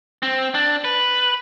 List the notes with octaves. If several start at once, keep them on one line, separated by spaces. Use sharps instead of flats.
C4
D4
B4